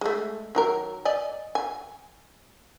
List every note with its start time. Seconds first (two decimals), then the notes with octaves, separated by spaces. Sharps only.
0.01 G#3 A3
0.55 D#3 F#3 A#4
1.05 D5 D#5 G#5
1.55 G#5